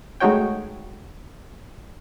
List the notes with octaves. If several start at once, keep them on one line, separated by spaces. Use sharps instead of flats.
G#3 A3 D#4 F#4 C#5 G5